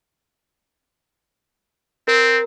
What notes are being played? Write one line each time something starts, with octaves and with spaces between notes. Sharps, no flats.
C4 A#4